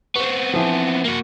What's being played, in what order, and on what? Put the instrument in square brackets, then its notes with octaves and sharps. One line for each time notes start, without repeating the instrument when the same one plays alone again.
[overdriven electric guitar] B3 C4 [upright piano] C#6
[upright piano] E3 F3
[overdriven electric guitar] A#3 F#4